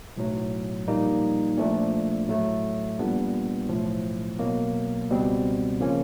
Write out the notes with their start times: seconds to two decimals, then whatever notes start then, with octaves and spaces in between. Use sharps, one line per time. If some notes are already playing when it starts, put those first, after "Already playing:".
0.17 B1 A2 F#3
0.87 A#1 A#2 G3 A#3 D#4
1.57 A#2 F3 A3 D4
2.28 A2 F#3 A3
2.98 A#1 A#2 G3 B3 D4
3.69 B1 A2 F3
4.39 B2 F#3 A#3
5.10 C#2 B2 G3 C4
5.80 C#3 F3 A#3 C#4